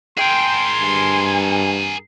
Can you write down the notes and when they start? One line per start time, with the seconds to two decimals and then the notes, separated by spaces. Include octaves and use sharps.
0.18 G#4 A#4 G5 C6
0.80 G2 G#5